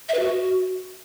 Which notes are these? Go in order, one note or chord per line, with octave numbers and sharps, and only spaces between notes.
E5
B4
F#4